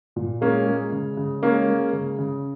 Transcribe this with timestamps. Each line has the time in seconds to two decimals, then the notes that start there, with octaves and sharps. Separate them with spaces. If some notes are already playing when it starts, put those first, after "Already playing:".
0.16 A#2
0.41 G#3 A#3 C#4
0.67 G#3
0.92 C#3
1.17 C#3
1.42 G#3 A#3 C#4
1.68 G#3
1.93 C#3
2.19 C#3